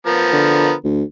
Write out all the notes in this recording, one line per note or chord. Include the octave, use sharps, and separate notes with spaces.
F3 B3 A#4
D3
D2